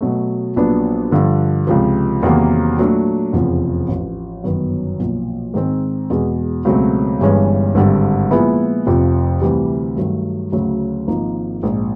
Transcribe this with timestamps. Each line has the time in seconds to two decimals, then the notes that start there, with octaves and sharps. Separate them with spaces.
0.01 B2 F#3 A3
0.56 A#1 A#2 F#3 B3 D4
1.11 G2 D3 F3
1.67 C#2 C3 F3
2.23 E2 C3 D#3 F#3 A#3
2.77 A#2 F#3 A3 D4
3.33 F1 E2 C#3 F3
3.88 A1 A2 F3
4.44 G1 F#2 D#3 F#3 B3
4.99 B1 A#2 F3
5.54 G#2 D#3 G#3 C4
6.10 E2 B2 G#3
6.65 C#2 B2 F#3 A3 C4
7.20 G1 G2 E3 G#3 C#4
7.75 G#1 G2 D3 G3
8.31 A#2 F3 G#3 B3 E4
8.86 F1 F2 C3 F3
9.41 D2 C3 E3 G3
9.96 G2 D#3 F#3 A3
10.52 D2 C#3 F#3 A3
11.07 G#1 G#2 F3 A#3 D#4
11.63 A#1 G#2 F3